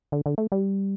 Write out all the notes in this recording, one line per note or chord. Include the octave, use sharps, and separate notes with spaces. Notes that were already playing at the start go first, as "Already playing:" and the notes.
D3
D3
A3
G3